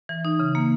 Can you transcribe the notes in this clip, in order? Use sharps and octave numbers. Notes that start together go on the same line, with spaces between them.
E3
D#4
C#3
A#3